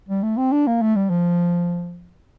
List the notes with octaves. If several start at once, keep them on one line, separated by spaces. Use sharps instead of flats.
G3
A3
C4
D4
A#3
A3
G3
F3